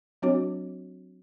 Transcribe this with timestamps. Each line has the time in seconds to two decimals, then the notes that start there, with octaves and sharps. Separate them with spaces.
0.22 F#3 C4 D4 F#4 C#5 D6